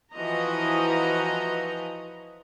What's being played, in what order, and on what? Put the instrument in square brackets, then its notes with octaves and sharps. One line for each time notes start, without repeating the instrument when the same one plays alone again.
[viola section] E3 F3 F#4 D#5 A#5